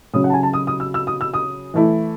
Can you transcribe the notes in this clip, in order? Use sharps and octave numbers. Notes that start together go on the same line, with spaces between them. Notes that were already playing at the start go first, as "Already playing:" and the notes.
C#3 F#3 C#4 D#6
F#5
A5
G#5
A5
D#6
D#6
E6
E6
D#6
E6
D#6
E3 A3 E4